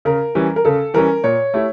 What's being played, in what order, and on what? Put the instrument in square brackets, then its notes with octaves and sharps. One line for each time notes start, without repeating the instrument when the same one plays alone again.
[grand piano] C#3 [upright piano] A#4
[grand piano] E3 G3 C#4
[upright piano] A#4
[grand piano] C#3 [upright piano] A4
[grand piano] E3 G3 C#4 [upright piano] A#4
[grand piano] A#2 [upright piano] C#5
[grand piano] A3 E4 G4